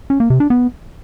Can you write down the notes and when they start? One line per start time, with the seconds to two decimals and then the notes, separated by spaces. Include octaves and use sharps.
0.10 C#4
0.20 A#3
0.30 C3
0.40 D4
0.50 B3